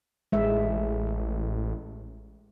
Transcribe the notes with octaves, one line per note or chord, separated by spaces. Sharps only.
A1 G#3 E5